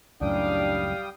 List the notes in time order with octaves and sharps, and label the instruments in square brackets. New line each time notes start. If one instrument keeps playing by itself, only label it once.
[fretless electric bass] C#2 F#2 A2 [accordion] G3 G5 D#6 [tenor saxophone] D4 [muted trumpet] F5